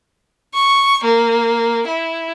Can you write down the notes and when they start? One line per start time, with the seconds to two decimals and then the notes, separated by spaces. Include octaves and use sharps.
0.54 C#6
1.04 A#3
1.87 E4